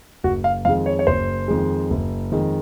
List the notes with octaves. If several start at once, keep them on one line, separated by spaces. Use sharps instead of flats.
F#1 F#4
F5
F2 D#3 G#3 F5
C#5
C#5
F#1 C5
F2 D#3 G#3
F#1
F2 D#3 G#3